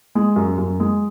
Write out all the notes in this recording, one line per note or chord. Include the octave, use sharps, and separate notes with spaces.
G#3
F#2
F#2
G#3